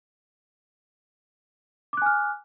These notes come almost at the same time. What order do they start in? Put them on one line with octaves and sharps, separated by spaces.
D6 F#6 G#5 F6